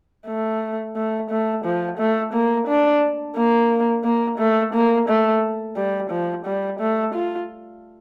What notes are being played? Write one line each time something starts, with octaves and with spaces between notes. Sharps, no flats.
A3
A3
A3
F3
A3
A#3
D4
A#3
A#3
A3
A#3
A3
G3
F3
G3
A3
F4